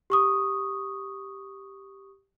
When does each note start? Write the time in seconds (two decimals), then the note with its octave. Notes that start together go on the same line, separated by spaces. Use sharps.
0.10 G4 C#6 D#6